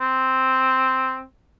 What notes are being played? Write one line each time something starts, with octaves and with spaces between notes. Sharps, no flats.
C4